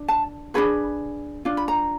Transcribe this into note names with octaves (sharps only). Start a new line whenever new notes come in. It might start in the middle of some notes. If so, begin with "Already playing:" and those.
Already playing: D4
A5
D4 F4 G#4 B4 B5
D4 F4
B5
A#5